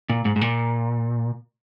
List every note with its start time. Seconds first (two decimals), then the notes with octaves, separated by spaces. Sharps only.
0.09 A#2
0.25 G#2
0.36 G#2
0.41 A#2